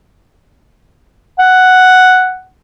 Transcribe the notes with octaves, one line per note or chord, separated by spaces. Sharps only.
F#5